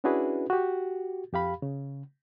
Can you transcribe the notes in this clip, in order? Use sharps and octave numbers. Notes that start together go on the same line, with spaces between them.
C#4 D4 E4 F#4 G#4 B4
F#4 G4
F2 G4 F5 B5
C#3